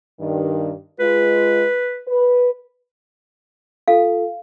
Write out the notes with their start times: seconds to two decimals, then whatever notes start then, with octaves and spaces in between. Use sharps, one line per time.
0.20 G2 D#3
1.00 G#3 F4 B4
2.08 B4
3.88 F4 A4 F5